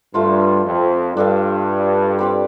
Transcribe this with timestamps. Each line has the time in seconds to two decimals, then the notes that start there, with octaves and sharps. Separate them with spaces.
0.14 G2 A3 F4 C5
0.66 F2
1.16 G2 D4 A4 F5
2.19 G3 C4 G4 D5